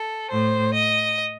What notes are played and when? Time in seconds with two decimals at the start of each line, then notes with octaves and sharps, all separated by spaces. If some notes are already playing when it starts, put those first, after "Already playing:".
Already playing: A4
0.30 A2 C5
0.73 D#5